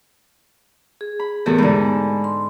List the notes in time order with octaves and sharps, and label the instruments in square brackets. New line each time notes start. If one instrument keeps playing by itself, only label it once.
[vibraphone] G#4
[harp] B5
[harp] E2 A2 E3 [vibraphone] G4 A4 A#4
[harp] G#2 D3 [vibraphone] G#3 B5
[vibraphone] C6